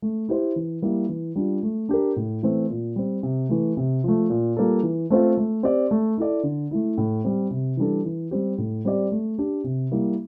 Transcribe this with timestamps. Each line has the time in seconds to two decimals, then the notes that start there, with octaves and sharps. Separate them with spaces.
0.02 A3
0.29 E4 G4 C5
0.56 E3
0.82 G3 A#3 E4
1.09 E3
1.35 G3 D4 F4
1.63 A3
1.89 D4 G4 A#4
2.16 A2
2.43 E3 A3 C4
2.70 A#2
2.96 G3 C4
3.23 C3
3.49 E3 A3
3.77 C3
4.04 F3 A3
4.30 A#2
4.57 G3 A#3 F4 A4
4.83 E3
5.10 A3 C4 F4 C5
5.38 A3
5.63 C4 G4 D5
5.91 A3
6.18 E4 A4 D5
6.43 D3
6.71 A3 E4
6.98 A2
7.24 G3 C4
7.51 C3
7.77 E3 G3 D4 A4
8.05 E3
8.31 G3 C4 G4
8.58 A2
8.85 G3 C4 G4 D5
9.12 A3
9.39 D4 G4
9.64 C3
9.91 G3 A#3 E4